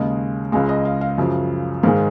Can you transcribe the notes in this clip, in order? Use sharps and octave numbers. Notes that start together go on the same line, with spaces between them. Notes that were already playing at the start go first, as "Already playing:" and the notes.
Already playing: D#2 C#3 G#3 D#5
C#2 C#3 G#3 F5
D#5
F5
F5
F#2 C#3 F3
G#2 D#3 G#3 F5